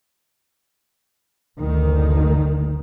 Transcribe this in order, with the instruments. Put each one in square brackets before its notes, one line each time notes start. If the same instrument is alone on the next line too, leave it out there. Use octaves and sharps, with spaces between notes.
[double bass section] F#1 D2 D#3